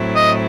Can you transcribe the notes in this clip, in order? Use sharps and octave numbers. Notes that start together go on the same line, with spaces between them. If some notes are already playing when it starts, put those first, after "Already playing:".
Already playing: A2 F#3 C4 E4
D#5